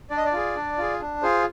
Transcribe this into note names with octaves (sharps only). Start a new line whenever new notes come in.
D4 D5
D#5
D5
F4 G#4
D4
F4 G#4
D4
F4 G#4 C5